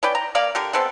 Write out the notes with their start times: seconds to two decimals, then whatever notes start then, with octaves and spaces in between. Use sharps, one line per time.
0.03 C#4 B4 D5 G5
0.15 A#5
0.35 A#3 A#4 D5 F5
0.55 D3 G4 A#4
0.73 G#3 B3 C4 A4